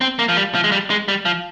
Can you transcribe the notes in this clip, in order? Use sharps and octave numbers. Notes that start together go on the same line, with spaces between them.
C4
A#3
F3
G3
F3
G#3
G3
G#3
G3
F3